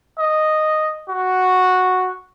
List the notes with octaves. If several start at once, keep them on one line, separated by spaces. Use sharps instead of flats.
D#5
F#4